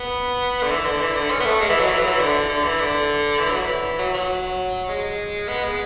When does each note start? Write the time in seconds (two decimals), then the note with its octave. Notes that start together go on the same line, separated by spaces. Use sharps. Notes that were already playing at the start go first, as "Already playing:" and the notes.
Already playing: B3
0.63 D3
0.70 E3
0.85 D3
1.01 E3
1.15 D3
1.31 C#4
1.40 B3
1.46 A3
1.61 G#3
1.70 E3
1.80 F#3
1.90 E3
2.00 F#3
2.08 E3
2.20 D3
2.49 D3
2.64 E3
2.79 D3
3.39 E3
3.51 F#3
3.62 E3
3.98 F#3
4.14 F#3
4.89 G#3
5.48 B3
5.64 G#3